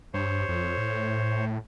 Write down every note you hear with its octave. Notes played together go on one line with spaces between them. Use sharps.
G2 C5 C#5
F2
A2